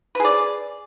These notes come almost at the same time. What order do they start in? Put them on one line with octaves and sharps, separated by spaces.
B4 G#4 D5